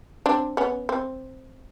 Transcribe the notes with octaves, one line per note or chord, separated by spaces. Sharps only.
C4 D4
B3 C#4
C4